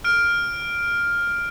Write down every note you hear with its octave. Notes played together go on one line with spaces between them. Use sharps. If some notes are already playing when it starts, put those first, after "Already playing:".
F6 D7